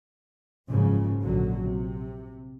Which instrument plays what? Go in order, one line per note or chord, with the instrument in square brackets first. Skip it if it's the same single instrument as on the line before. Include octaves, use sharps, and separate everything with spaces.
[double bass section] F#1 G#2 C#3 F3
A#1 D3 F#3
C3